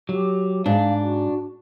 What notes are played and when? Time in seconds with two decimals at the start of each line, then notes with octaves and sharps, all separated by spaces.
0.09 F#3 G4
0.66 G#2 D4 F5
1.01 F#4